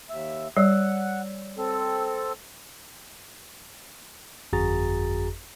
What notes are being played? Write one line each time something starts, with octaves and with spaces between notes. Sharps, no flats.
D#2 E5
G3 C#5 D5 F#5 E6
C4 A4
G1 F2 F#4 G#4 A#5 A6